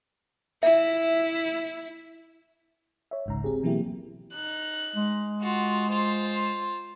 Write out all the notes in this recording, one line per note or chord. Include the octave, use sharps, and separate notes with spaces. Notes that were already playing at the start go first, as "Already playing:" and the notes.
E4 E5
C#5 E5
G1 C2 G#2 C#3 A#5
C4 G4 G#4
B2 E3 F#3 A#3 E4 G4
D#4 F#6
G#3
F4 F#4
F4 C5